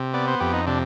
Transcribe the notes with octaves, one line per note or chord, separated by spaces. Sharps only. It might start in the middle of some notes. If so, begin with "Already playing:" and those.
Already playing: C3
B3 D5
C5
F2 G4
D#4
C3 D4